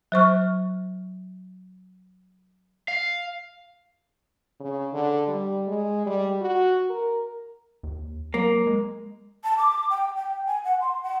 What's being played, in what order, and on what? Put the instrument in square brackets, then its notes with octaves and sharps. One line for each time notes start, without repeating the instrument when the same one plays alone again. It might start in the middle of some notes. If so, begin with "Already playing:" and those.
[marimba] F#3 C5 C#6 F6
[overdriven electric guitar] F5
[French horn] C#3
D3
G3
G#3
G3
F#4
A#4
[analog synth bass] D#2
[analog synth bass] F#3 [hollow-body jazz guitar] A#3
[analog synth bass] G#3
[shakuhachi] A5
D6
G5
G5
G#5
F#5
C6
F#5